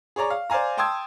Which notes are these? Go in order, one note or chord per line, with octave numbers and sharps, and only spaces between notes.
G#4 C#5 D5 A#5 C#6
F5
C5 D5 F5 G#5 A#5
G5 A5 C6 D#6 E6 G#6